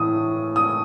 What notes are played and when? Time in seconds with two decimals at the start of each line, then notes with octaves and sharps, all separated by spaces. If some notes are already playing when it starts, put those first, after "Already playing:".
Already playing: A2 E3 D#6
0.56 D#6